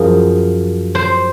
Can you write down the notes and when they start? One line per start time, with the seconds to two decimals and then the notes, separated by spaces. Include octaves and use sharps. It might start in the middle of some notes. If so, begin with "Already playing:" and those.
Already playing: F#2 F3 G#4 A#4
0.95 C5